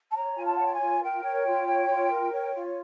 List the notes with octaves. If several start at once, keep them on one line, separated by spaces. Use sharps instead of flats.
A5
C#5 A#5
F4 G#5
A5
C#5 F#5
G5
G#5
F4
A#4 G5
C#5
F4
C#5
F4
A#4
C#5
F4